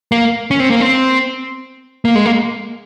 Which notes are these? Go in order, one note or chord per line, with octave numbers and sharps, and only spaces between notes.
A#3
C#4
C4
A#3
C4
A#3
G#3
A#3